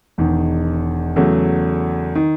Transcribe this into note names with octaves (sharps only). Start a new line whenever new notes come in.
E1 E2 D#3
E2 C#3 F#3 A3
D#3